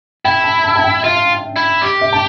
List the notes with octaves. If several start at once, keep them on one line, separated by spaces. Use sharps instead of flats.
E4 G5
A5
A5
A5
G5
F4 E5
E4
G4
E5
A5